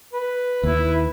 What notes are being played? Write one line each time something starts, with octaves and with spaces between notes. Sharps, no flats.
B4
D#2 E4